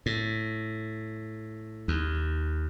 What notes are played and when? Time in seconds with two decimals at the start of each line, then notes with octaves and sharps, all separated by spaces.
0.06 A2
1.88 D#2